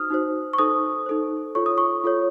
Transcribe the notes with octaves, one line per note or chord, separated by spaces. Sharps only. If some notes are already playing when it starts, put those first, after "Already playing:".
Already playing: D#4 F#4 C5 D#6 F6
D#4 F#4 C5
C#6
D#4 A4 C5 D#6
D#4 A4 C5
F4 A4 C#5 C#6
D#6
C#6
F4 A4 C#5